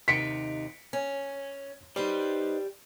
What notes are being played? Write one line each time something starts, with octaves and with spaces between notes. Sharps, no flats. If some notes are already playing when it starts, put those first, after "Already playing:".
D#2 C3 D#4 B6 C#7 D7
C#4
D#4 G4 B4 C5 D5